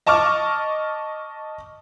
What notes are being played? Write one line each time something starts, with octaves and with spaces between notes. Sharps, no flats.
D#5 A5 C#6 D6 F6